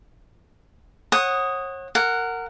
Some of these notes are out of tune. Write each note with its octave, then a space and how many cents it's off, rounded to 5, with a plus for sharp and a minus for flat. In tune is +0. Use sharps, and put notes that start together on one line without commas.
C#5 -35 F#5 +0 D#6 +0
A#4 -20 F#5 +0